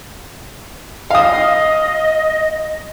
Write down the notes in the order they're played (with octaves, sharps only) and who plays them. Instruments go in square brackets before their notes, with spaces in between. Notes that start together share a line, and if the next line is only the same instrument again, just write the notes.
[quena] D#5 [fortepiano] F5 D#6